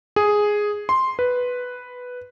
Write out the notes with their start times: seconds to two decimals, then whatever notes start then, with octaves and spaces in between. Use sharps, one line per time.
0.16 G#4
0.89 C6
1.19 B4